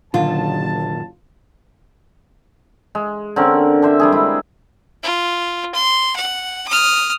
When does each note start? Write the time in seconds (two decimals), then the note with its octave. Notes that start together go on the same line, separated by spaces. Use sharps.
0.14 F#1 A#2 D3 D#3 F#3 F4 A5
2.95 G#3
3.36 D3 C4 C#4 A#4
3.82 D4 C5 E5
4.00 G3 D4 G#4
4.12 G#3 E4
5.03 F4
5.75 C6
6.16 F#5
6.68 D#6 F6